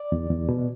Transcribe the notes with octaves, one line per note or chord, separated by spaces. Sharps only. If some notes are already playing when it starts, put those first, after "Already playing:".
Already playing: D5
E2
E2
B2